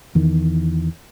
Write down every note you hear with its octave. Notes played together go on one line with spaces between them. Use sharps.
E2 D#3 E3